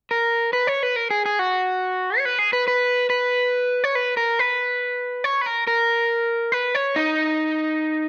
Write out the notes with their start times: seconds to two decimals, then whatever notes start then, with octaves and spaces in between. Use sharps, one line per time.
0.11 A#4
0.53 B4
0.67 C#5
0.83 B4
0.96 A#4
1.11 G#4
1.26 G#4
1.39 F#4
2.18 C#5
2.25 B4
2.39 G#4
2.53 B4
2.68 B4
3.10 B4
3.84 C#5
3.95 B4
4.17 A#4
4.39 B4
5.24 C#5
5.41 B4
5.46 A#4
5.67 A#4
6.52 B4
6.75 C#5
6.96 D#4